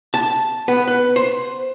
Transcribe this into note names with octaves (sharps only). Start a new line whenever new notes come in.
A5
B3
B4
C5